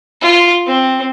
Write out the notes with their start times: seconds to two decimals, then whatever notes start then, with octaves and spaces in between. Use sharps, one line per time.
0.21 F4
0.67 C4